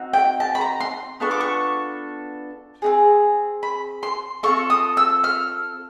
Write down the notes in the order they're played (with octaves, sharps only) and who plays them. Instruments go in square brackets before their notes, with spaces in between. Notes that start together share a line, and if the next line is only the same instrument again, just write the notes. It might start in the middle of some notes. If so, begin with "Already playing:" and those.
Already playing: [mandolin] C4 D#4 F#4
G5
A5
B5
A#5
C6
B3 D4 F4 A4 C#6
D6
C#6
C4 D#4 G#4
B5
C6
C4 F4 A4 C#6
D#6
E6
F6